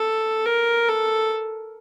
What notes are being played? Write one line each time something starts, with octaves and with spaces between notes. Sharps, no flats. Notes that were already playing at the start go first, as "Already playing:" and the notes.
Already playing: A4
A#4
A4